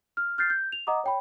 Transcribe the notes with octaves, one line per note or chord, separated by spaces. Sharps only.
F6
F6 G6 A6 C7
G6
F7
D#5 F#5 A#5 D6 D#6
C#5 G5 B5